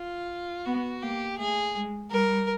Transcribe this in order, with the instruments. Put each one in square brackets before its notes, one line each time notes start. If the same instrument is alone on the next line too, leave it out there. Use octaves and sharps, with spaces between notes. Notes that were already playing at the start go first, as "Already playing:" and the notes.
Already playing: [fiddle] F4
[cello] B3 [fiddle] F#4
[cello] A#3 [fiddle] G4
[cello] A3 [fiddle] G#4
[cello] G#3
[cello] G3 [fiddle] A#4